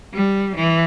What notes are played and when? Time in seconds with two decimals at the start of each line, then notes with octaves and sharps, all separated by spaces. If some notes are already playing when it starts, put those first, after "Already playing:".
0.13 G3
0.56 E3